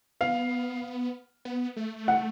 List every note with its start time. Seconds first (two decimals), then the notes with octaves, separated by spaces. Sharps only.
0.21 B3 F5
1.45 B3
1.76 A3
2.08 F#5